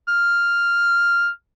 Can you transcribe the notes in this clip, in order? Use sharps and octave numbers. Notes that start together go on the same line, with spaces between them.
F6